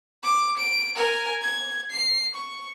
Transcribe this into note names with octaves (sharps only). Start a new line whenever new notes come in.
D6
D7
A#4 G#5
G#6
C7
C#6